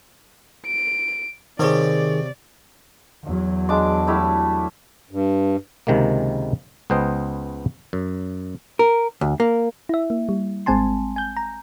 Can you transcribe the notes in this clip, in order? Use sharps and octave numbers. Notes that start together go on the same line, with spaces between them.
D7
C3 D#3 G#4 C#5 D5
E2 F#3
G#3 D4 D6
G3 A3 E4
G2
C#2 C3 D#3 G#3 A#3
C#2 B3 C5 D#5 G5
F#2
A#4
D2
A#3
E4 E5
A#3
G3
G#1 G#3 C4 G#5 A5 C6
G#5 G6
A#5